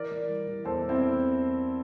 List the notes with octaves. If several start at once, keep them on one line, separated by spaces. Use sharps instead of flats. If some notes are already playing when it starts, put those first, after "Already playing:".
Already playing: E3 A#4 D5
E3
G3
E3
E2 A4 C5
E2
C4 E4